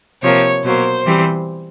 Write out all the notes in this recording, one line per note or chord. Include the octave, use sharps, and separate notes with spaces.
C3 F3 A#3 C#5
B2 F#3 A#3 C5
E3 G3 C4